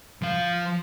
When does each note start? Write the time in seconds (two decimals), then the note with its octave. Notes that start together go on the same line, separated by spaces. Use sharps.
0.22 F3 F5